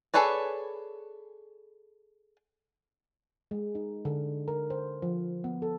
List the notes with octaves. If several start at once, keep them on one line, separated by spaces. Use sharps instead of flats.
G#4 A4 B4 C#5 D5
G#3
D#4
D3
A#4
C5
F3
B3
A4